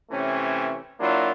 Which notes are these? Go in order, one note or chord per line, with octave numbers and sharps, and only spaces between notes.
C3 E3 A3 C#4
F#3 A#3 D4 E4 F4